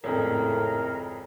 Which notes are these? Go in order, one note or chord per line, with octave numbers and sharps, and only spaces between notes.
G#1 F2 A2 C#3 A#4